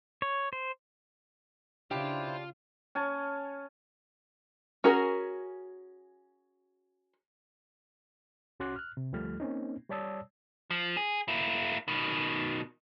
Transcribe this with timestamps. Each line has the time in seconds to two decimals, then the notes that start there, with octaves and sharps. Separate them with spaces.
0.22 C#5
0.53 C5
1.91 C#3 D4 E4 F4 G4 C5 F5
2.95 C#4 G#5 A5
4.84 C#4 F#4 G#4 A#4
8.60 C2 C#4 F#4 C6 D6 F#6
8.76 F6 F#6
8.97 C3
9.13 D2 F3 G3 A3 F6
9.40 A#3 C4 C#4 D#4
9.89 G3 C#5 D5 A5 D#6 E6
10.71 F3
10.97 G#4
11.28 A#3 E4
11.88 B2 D#3